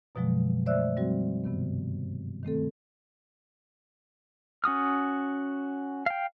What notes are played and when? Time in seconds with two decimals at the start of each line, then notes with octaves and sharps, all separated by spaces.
0.15 F#2 B2 D3 F3 F#3 G#3
0.66 A3 C5 D5 E5 E6 F#6
0.96 F3 G3 C4 F#4
1.44 G2 C3 D#3 B3
2.43 D#3 A3 C4 A4
4.64 C#4 F#4 D#6 F6
6.06 F5 G5